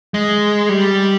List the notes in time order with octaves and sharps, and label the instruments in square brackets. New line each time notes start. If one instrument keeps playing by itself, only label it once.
[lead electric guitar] G#3
G3